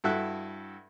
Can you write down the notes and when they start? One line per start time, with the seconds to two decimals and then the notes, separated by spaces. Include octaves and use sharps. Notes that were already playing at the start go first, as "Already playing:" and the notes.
0.04 G2 E4 F#4 A4 E5 F#6